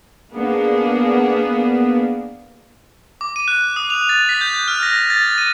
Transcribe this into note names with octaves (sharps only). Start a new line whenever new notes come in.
A#3 B3 D4 G#4
D6
D#7
F#6
D#6
F7
A6
B6
G6
F6
A#6
A6
D#7